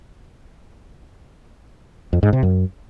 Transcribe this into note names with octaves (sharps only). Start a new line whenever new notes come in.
F2
G#2
C3
F#2